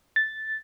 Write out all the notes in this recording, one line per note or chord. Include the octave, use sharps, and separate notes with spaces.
A6